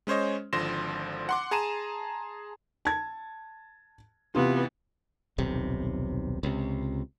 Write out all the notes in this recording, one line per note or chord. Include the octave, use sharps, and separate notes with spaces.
G#3 C#4 C5 C#5 D#5
G#1 D3 F3 C6 A#6 E7
F#5 C6 D6
G#4 A5 A#5 C6 D#7 E7
A5 G#6
C3 E3 B3 F4
D#1 B1 C3
C#2 C3